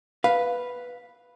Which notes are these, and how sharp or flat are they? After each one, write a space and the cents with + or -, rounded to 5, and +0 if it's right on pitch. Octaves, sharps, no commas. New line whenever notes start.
B4 +0 F5 +0